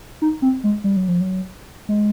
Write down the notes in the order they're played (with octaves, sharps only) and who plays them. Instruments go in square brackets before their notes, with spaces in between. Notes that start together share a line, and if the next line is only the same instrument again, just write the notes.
[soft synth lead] D#4
C4
G#3
G3
F#3
F3
F#3
G#3